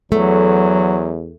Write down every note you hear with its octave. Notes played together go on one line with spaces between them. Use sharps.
E2 F#3 A3